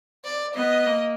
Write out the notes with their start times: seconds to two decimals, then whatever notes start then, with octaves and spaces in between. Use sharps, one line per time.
0.25 D5
0.55 B3 D#5
0.86 A#3